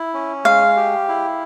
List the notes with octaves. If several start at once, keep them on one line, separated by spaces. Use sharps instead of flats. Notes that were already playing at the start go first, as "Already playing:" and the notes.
Already playing: E4
C#4
G#3 F5
G4
E4